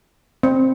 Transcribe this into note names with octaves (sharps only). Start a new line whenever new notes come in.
C4